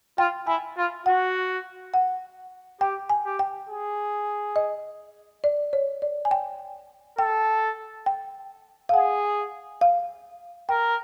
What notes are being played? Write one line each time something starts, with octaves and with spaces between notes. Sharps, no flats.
F4 G5
E4 G#5
F4
F#4 F#5
F#5
G4 G5
G#5
G4
G5
G#4
D#5
D5
C#5
D5
G#5
G5
A4 G5
G5
F5
G#4 F#5
F5
A#4 G5